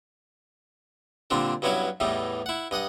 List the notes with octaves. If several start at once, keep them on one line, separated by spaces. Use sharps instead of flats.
A#2 D3 G3 C4 D4
G2 F#3 B3 C#4 E4 C#5
E2 A2 E3 G3 D#4
E4 F#5
G2 D#5 F#5 D#6